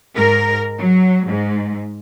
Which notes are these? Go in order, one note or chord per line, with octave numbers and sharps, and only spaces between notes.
G#2 A#4
F#3
G#2